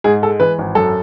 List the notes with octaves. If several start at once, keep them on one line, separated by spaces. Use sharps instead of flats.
G#2 G#4
G#3 A4
E3 B4
G#1
F#2 A4